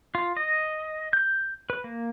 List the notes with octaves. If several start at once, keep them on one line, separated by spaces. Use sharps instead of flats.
F4
D#5
G6
B4
A#3